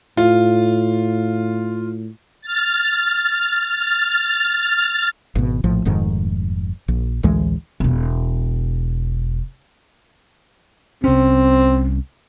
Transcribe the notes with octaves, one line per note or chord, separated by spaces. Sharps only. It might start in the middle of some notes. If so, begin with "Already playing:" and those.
A2 F4
F6 A6
G#1 B2
A#1 A2 F3
F1 F2 G#2 D#3
A#1
A1 D2 E3 G#3
E1 B2
C2 C4 C#4